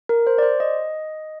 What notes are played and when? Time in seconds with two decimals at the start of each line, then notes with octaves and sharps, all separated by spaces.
0.09 A#4
0.27 C5
0.38 D5
0.43 C5
0.60 D#5